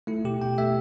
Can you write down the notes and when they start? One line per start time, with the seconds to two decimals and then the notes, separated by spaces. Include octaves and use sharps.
0.07 A3 E4
0.24 B2 G4
0.42 B2 G5
0.58 A3 E5